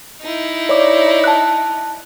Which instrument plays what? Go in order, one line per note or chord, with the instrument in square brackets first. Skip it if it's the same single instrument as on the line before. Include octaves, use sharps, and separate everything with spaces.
[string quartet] D#4 E4
[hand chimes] C#5 D5 D6
A5 F#6